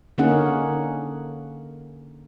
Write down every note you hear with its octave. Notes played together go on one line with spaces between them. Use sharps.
D3 A#3 C#4 D#4 G#4 F#5